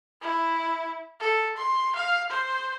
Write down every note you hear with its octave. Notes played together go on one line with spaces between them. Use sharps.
E4
A4
C6
F5
C5